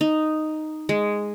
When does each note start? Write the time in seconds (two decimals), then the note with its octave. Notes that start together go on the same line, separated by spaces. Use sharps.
0.01 D#4
0.89 G#3